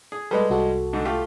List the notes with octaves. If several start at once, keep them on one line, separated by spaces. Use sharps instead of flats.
G#4
G3 G#3 A4 B4
C2 F#4 A4
G#2 D3
A3 F4 G4